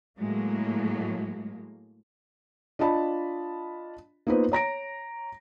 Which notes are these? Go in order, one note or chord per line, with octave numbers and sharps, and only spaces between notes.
A2 F#3 G#3 A#3
D4 F4 D#5 A5 B5
A#3 B3 D#4 F4 B4 C5
C#5 A#5 A#6 D7